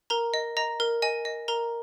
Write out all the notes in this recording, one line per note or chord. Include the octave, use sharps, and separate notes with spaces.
A#4 A#5
D#5
D#5 A#5
A#4
D#5 G#5
D#5
A#4 A#5